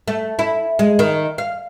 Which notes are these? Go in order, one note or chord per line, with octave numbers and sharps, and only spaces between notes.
A3
E4
G#3
D#3
F5